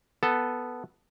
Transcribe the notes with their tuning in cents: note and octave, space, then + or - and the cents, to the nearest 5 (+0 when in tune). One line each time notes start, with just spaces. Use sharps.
B3 +0 A4 +0